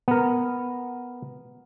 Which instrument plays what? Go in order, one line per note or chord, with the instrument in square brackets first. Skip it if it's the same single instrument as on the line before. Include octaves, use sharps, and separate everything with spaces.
[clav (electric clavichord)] B3 A#4